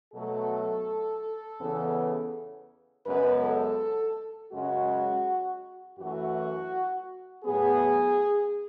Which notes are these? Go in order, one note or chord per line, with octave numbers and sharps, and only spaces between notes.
B2 F#3 A3 A4
E2 C#3 E3 B3
F#2 C#3 G#3 B3 B4
A4
F#2 C#3 G#3 F#4
F#2 E3 A3 F#4
A2 F#3 B3 G#4